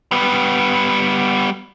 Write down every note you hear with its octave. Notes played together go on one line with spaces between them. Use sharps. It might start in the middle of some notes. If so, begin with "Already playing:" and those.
G3 B3